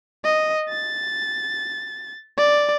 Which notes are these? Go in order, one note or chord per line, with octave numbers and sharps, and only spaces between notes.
D#5
A6
D5